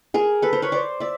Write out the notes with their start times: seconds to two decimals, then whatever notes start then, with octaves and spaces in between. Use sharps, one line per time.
0.14 G#4 A#4
0.42 A4 B4
0.53 A#4 C5
0.62 B4 C#5
0.72 C5 D5
1.00 D5 E5